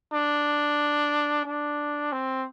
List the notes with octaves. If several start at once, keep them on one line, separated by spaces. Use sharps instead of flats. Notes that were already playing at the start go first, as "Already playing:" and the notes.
D4
D4
C4